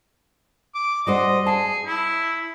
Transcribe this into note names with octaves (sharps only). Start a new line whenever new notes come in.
D6
G3 F#4 C5 D#5
G#4 A5
E4